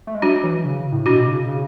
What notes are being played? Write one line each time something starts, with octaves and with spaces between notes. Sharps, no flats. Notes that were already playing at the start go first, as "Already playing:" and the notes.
A3
G#3
F#3 D4 F#4
E3
C#3
A2
B2 D4 F#4
C#3
C#3